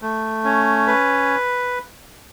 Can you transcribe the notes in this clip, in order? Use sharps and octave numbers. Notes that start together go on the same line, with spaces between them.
A3
C#4
B4